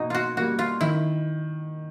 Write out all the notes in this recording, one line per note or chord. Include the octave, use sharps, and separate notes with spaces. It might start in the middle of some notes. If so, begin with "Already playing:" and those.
Already playing: B2 A#3 D#4
F4 F#4
G3 A#3 F#4
F4
D#3 E4